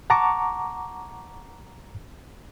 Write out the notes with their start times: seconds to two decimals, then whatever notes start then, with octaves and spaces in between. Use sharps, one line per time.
0.10 F#5 A5 A#5 C#6 D6